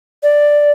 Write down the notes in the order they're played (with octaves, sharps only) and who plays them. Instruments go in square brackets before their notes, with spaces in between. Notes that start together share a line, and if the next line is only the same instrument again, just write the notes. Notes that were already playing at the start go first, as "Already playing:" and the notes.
[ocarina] D5